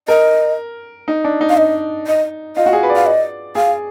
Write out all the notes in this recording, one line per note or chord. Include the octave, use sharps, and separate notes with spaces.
A#4 D#5
D#4
D4
D#4
F5
D#5
D#5
F4 D#5
F#4
G#4
B4
D5
F5
D#5
G#4 F5